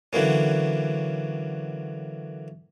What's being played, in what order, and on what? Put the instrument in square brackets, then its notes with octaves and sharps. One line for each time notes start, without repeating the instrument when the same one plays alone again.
[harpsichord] D3 E3 F#3 A#3 C#4